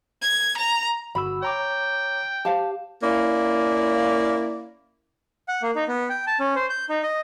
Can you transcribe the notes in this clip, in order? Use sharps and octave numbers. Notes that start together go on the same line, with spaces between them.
G#6
A#5
G1 F#4 B5 E6
C#5 G5 A#5 D6
G4 C5 F5 A5
A#3 C#4 E4 D5 F5
F#5
A#3
D#4
B3
G5
A5
C#4
C5
G6
D#4
D#5